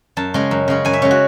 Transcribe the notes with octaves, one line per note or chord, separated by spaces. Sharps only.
F#2 A5
C#3 G#3 C#4
F#2
C#3 G#3 C#4
F#2 G#5
E5
C#3 G#3 C#4 C#5
F#4